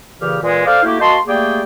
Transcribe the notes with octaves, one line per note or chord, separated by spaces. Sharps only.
A#2 C#3 E3 G4 F6
A#2 E3 G#3
A4 C5 D5 F5
A3 A#3 E4 F#4 G4
A#3 F#4 D#5 A5 C6
G3 A3 A#3 G#4 D5 G5